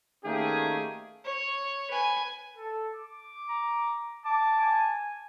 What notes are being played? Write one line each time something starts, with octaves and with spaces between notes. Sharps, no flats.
D#3 A3 A#3 C#4 G4 G#4
C#5
B4 G#5
A4
D6
A#5
A5 D6
G#5